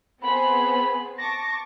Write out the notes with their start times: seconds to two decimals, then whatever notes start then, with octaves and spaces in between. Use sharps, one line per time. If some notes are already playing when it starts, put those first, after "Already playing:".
0.22 B3 C4 G#4 B5
1.18 A5 C#6 D6 A#6